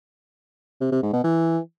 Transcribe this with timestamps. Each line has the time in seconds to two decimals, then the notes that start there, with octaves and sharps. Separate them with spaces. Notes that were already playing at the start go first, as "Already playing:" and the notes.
0.81 C3
0.92 C3
1.03 G#2
1.13 B2
1.24 E3